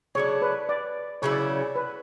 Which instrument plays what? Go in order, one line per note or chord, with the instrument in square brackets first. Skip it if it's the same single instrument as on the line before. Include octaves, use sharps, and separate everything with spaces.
[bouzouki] C#3 F#3 A3 D4 [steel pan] C#5
[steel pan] B4
D5
[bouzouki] C#3 F#3 C#4 E4 [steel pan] C#5
[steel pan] D5
C#5
B4